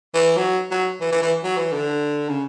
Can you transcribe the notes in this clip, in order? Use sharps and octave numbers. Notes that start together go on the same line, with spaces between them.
E3
F#3
F#3
E3
E3
E3
F#3
E3
D3
C#3